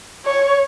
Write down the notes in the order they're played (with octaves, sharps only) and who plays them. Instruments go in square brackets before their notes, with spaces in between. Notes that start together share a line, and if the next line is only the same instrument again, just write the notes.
[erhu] C#5